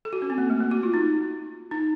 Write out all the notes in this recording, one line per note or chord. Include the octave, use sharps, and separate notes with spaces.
A4
F#4
C#4
C4
A#3
A3
A#3
F#4
F4
D#4
D#4